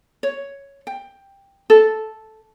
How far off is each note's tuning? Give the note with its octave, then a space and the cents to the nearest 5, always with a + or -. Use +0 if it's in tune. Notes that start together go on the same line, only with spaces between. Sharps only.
C#5 +5
G5 +10
A4 -5